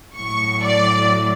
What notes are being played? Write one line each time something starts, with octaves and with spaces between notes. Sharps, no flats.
A2 F#3 C#6
D5